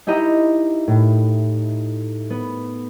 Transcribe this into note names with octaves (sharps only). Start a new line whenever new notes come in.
D#4 E4 G4 D#5 A#5
A2
B3